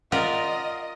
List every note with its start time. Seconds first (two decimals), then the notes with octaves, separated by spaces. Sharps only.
0.12 F4 A#4 D5 D#5 F#5